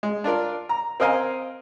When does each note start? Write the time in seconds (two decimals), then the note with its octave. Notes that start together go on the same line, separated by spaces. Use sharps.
0.03 G#3
0.24 D4 F4 A#4 D5
0.69 A#5
1.00 C4 A#4 D#5 F5 G#5 A#5